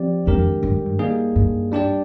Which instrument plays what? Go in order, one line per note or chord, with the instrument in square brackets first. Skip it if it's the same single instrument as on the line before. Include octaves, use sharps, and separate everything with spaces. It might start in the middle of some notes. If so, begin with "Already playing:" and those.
Already playing: [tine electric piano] F3 C4 G4 D5
[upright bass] F2 [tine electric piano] D#3 G#3 D4 G4 A#4
[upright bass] G2
[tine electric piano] G3 A#3 D#4 G#4
[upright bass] G2
[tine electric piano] G3 D4 G4 D5